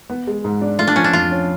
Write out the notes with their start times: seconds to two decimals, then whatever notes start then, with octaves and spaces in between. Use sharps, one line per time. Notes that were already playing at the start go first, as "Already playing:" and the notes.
0.10 B3
0.27 G#3
0.44 G#2
0.61 D4
0.79 A3 F4
0.87 D4
0.96 F3 C#4
1.04 D4
1.13 F2 F4
1.31 C#4